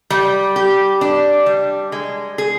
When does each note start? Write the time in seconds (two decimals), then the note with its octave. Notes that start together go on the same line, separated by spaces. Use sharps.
0.10 G3
0.56 G4
1.01 D4
1.46 G3
1.92 G#3
2.38 G#4